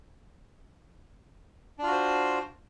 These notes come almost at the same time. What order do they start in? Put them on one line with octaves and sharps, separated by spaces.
D4 F4 F#4 C5